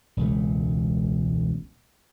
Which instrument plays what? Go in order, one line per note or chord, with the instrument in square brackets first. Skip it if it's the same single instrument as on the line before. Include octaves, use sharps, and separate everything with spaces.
[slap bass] E1 C#2 A3